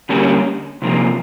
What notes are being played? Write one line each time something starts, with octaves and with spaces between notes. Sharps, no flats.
D3 G3 A#3 C#4
C3 F3 A#3 D#4